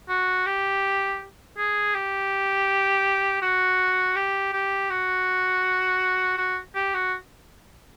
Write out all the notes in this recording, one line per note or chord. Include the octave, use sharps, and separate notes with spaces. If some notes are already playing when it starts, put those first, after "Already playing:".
F#4
G4
G#4
G4
F#4
G4
G4
F#4
F#4
G4
F#4